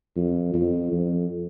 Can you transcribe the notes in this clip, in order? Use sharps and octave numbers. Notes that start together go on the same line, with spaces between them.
F2
F2
F2